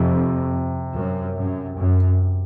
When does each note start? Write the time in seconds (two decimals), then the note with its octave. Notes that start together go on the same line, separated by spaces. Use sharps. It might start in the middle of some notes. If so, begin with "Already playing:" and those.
Already playing: F2 C3
0.94 F#2
1.37 F#2
1.78 F#2